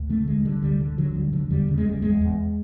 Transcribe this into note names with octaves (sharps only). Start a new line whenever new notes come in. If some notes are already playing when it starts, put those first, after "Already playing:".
Already playing: D2
D3 A3
D3 G#3
D3 G3
D2 G3
D3
D3 F#3
D2 G3
D3 F#3
E2 G3
C#3
G#3
E2 G3
E2 G#3
E2